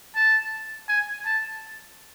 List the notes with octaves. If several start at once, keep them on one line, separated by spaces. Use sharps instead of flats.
A5
G#5
A5